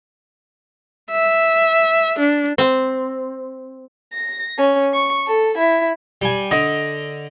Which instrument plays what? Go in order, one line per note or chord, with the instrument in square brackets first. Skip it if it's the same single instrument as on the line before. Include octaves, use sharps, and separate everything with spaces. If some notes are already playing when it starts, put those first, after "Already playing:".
[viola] E5
D4
[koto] C4
[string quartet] A#6
C#4
C#6
A4
E4
[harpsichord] G3 G#5
[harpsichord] D3 [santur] D#5